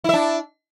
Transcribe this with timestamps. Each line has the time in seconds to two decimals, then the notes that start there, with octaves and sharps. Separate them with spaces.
0.04 E4
0.09 E5
0.14 D4